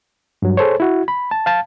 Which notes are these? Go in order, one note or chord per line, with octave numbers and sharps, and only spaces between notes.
G2 F#3
G#4 A4 C5 C#5
E4 F#4
B5
A5
F5 A5